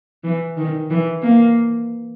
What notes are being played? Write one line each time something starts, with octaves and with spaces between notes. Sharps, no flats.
E3
D#3
E3
A#3